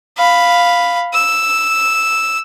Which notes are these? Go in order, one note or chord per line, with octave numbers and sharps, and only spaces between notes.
F5 B5
E6